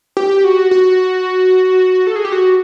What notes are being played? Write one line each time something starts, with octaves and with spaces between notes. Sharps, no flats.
G4
F#4
F#4
A4
G#4
G4
F#4